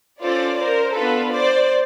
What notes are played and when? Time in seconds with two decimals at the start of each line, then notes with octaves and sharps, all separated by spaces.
0.22 C#4 F4 A4 C5 D5
0.59 A#4 C5
0.95 B3 D4 F4 A4 B4
1.32 C5 D5